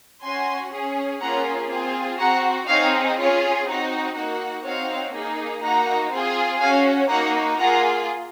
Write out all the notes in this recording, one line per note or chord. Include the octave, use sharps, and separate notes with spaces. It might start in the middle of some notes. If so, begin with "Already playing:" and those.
C#4 F#4 G#5 C6
C#4 G#4
A#3 C#4 F4 G#4 F#5 A#5
C4 F4 G#4
C4 F#4 F#5 A#5
C4 D#4 G#4 C#5 F5
C#4 F4 G#4 C#5
C4 D#4 F#4
A#3 D#4 F#4
C4 D#4 F#4 C#5 F5
A#3 D#4 G#4
A#3 D#4 F#4 F#5 A#5
C4 F4 G#4
C#4 F#4 F5 G#5
A#3 D#4 F#4 F#5 A#5
A#3 F4 G#4 F#5 A#5